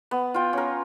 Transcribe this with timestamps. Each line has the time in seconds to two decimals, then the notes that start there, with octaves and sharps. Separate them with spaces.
0.11 B3
0.34 F4 G5
0.53 C#4 A#4